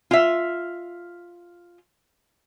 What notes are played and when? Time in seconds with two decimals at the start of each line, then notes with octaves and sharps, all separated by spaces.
0.11 F4 E5